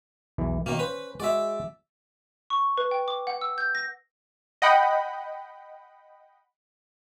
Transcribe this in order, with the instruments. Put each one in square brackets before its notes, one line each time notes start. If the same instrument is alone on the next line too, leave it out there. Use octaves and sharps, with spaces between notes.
[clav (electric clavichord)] B1 E2 E3
[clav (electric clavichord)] B2 C#4 [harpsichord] D#3 A#3
[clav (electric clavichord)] C#4 C5 [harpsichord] B4
[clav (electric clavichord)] G#3 F#4 G#4 [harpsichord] D5 E5
[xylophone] C#6
B4
G5
D6
F#5
E6
G6
A#6
[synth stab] D#5 F#5 G5 B5